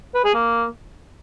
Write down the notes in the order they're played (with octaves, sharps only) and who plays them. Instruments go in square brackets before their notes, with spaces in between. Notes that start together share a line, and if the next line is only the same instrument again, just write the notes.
[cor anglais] B4
G#4
A#3